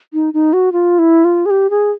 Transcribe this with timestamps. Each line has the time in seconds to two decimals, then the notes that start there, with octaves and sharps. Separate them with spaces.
0.14 D#4
0.34 D#4
0.53 F#4
0.72 F4
0.99 E4
1.25 F4
1.46 G#4
1.50 G4
1.70 G#4